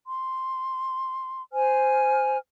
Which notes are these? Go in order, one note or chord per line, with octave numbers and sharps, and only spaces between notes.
C6
C5 G#5 F6